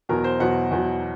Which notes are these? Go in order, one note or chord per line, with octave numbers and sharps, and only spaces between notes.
E2 B2 F#3 A#4
C5
E2 B2 F#3 F#5
E2 B2 F#3